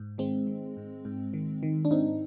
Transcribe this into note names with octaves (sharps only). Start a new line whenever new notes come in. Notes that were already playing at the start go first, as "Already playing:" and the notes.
Already playing: G#2
D#3 G#3 C4
D#3
G#2
G#2
D#3
D#3
D4
G#2 C4 D#4